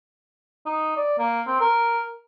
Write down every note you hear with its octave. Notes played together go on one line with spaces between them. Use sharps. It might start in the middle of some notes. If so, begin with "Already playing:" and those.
D#4
D5
A#3
C4
A#4